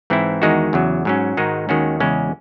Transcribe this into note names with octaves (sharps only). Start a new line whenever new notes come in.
G#2 E3 C4 E4
E2 D#3 G#3 D#4 F#4
E2 C#3 F#3
G#2 F#3 C#4
G#2 D#3 G#3 D#4 F#4
D#2 D#3 G#3 C#4 F#4
E2 C#3 G#3 C#4